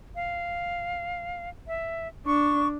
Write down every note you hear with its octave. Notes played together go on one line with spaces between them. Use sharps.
F5
E5
D4 C#6